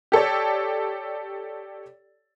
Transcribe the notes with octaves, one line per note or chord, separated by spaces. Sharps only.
G4 A4 C#5 D5